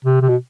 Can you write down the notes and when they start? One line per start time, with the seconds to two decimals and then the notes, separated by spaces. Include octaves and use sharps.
0.05 C3
0.21 C3
0.29 B2